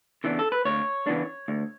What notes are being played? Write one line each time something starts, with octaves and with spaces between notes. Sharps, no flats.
C#3 E3 B3 D4
A4
B4
D2 C#5
C#3 E3 B3 D4
D2